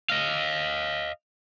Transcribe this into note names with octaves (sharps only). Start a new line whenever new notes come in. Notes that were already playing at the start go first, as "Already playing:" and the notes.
D#5 F5